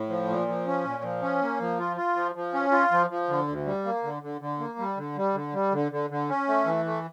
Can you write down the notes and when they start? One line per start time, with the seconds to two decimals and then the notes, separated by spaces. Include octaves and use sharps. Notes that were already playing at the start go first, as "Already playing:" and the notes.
Already playing: A2
0.09 F3
0.29 A#2
0.48 F3
0.67 C#4
0.84 A#2
1.03 F3
1.22 C#4
1.42 A#3
1.60 F3
1.79 F4
1.97 F4
2.16 F3
2.35 F3
2.53 C#4
2.72 F4
2.92 F3
3.10 F3
3.29 D3
3.48 D2
3.66 G3
3.85 A#3
4.03 D3
4.22 D3
4.41 D3
4.59 A#3
4.79 G3
4.97 D3
5.16 G3
5.34 D3
5.53 G3
5.73 D3
5.92 D3
6.10 D3
6.29 C#4
6.48 A3
6.66 E3
6.85 A3